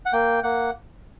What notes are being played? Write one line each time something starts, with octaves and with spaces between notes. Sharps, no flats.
F#5
A#3 G5
A#3 F#5